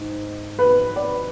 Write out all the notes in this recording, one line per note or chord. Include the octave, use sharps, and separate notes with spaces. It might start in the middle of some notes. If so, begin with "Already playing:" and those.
Already playing: G#2
B4
D5